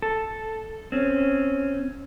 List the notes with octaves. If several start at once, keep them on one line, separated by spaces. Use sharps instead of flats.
A4
C4 C#4